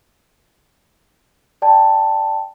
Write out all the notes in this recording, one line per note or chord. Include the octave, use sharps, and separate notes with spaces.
D5 G5 A5